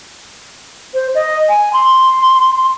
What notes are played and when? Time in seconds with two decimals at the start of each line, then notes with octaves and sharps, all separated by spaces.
0.94 C5
1.15 D#5
1.49 G#5
1.73 C6